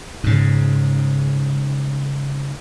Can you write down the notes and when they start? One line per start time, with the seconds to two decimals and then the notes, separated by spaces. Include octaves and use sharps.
0.24 G#2 C#3